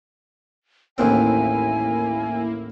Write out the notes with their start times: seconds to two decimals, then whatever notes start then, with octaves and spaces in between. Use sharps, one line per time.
0.98 A1 D#2 A#3 C4 E4 G#5